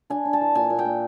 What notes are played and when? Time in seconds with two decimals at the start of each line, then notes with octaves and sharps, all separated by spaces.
0.10 D4 G#5
0.25 D4
0.33 A5
0.41 E3
0.55 A#2 G#5
0.70 A#2
0.79 G5
0.85 A#2